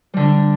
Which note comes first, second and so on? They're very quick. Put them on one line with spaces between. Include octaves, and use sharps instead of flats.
G3 D3 D4